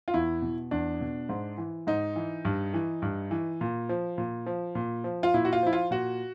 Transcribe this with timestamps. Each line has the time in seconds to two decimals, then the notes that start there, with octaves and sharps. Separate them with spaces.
0.08 F4
0.14 E2 E4
0.42 B2
0.71 E2 D4
1.01 B2
1.29 G#2
1.58 E3
1.87 G#2 D#4
2.16 E3
2.45 G2
2.74 E3
3.02 G2
3.31 E3
3.61 A#2
3.89 F3
4.18 A#2
4.46 F3
4.75 A#2
5.04 F3
5.23 F4
5.34 A#2 E4
5.45 F#4
5.53 F4
5.63 F3 E4
5.73 F4
5.91 A#2 F#4